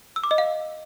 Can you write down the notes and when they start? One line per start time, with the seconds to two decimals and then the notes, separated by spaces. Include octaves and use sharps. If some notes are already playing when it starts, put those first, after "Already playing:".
0.16 E6
0.24 D6
0.31 D#5
0.38 F5